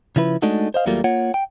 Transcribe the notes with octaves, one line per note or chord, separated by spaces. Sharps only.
C#3 F3 E4 B4
G#3 A3 D4 D#4 F#4
C5 D#5 F5
D#2 F#3 G3 A3 A#3 F4
A#3 F4 C#5 F#5
G5